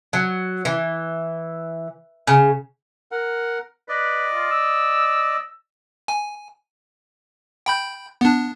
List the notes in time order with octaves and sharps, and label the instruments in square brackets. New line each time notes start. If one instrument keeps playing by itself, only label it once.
[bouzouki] F#3
E3
C#3
[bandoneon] A#4 F#5
[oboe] B4 [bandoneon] D5 D#5
[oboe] F4
E6
[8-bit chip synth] G#5
G5 B5 G6
B3 D4